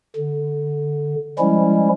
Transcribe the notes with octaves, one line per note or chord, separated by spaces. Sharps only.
D3
F3 G3 G#3 C#4 E4